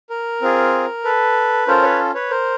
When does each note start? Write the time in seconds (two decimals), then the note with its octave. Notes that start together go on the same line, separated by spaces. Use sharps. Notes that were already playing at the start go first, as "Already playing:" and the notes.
0.10 A#4
0.42 C4 F4 G#4
1.04 A4 B4
1.67 C#4 F4 A4 A#4 C5
1.82 B4 C#5
2.15 B4 C#5
2.30 A#4 C5